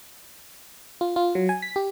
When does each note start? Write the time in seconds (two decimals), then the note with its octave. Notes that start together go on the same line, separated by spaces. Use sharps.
1.01 F4
1.16 F4
1.35 F#3
1.49 G#5
1.62 B6
1.76 G4